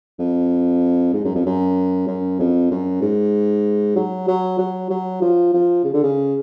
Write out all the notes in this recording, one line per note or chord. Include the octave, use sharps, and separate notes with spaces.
F2
G#2
F#2
F2
F#2
F#2
F2
F#2
G#2
F#3
F#3
F#3
F#3
F3
F3
C#3
D3
C#3